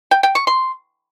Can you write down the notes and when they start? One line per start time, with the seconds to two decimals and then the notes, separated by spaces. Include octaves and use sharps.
0.11 G5
0.23 G5
0.35 C#6
0.47 C6